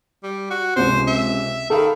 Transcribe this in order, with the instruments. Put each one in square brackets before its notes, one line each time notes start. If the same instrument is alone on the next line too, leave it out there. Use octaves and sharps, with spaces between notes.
[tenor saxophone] G3
F#4
[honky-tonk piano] C#2 C3 [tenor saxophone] C5
[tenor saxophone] E5
[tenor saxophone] D#3 [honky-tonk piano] A4 F5 B5